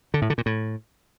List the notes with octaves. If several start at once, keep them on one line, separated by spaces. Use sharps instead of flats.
D3
A2
D3
A#2
A2